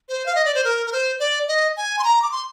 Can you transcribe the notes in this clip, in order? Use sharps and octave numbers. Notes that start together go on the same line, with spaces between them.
C5
F5
D#5
D5
C5
A#4
A#4
C5
D5
D#5
G#5
C6
A#5
D6
C6